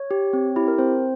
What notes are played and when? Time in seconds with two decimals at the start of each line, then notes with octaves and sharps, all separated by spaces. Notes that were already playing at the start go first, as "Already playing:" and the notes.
Already playing: C#5
0.11 G4
0.33 C4
0.56 E4 G4
0.68 A#4
0.78 C4 C5